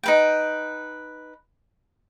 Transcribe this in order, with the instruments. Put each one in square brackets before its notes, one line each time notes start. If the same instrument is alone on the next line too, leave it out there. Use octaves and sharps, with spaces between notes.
[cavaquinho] D#4 B4 G5